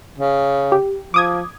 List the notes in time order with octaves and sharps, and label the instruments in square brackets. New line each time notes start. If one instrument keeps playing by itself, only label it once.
[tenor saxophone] C#3
[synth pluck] G4
[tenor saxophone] F3 [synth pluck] D6 D#6 G#6